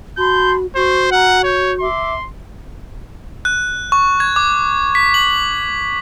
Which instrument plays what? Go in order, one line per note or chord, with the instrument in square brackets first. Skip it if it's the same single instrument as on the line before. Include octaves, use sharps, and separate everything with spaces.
[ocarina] F#4 [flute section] A5 B5 C6 [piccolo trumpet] G6
[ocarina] F#4 [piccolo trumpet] C5 [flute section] C#6
[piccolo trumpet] F#5 [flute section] A#5 F6
[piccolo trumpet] C#5 [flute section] G6
[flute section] E5 D6 [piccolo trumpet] C6
[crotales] F#6
C#6
G#6
D6
B6
F#7